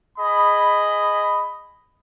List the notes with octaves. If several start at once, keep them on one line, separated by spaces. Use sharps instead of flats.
G#4 D#5 B5